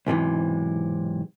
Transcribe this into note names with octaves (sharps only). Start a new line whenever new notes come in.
B1 G#2 C3 E3